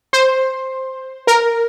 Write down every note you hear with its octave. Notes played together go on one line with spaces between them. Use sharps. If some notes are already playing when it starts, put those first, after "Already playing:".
C5
A#4